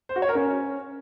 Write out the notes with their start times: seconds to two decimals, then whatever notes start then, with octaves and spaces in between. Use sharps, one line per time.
0.09 C5
0.16 F#4
0.22 C#5
0.29 A#4
0.35 C#4